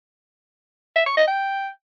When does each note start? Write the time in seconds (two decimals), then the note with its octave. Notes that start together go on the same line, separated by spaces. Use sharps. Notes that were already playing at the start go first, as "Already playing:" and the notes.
0.96 E5
1.06 C#6
1.17 D#5
1.28 G5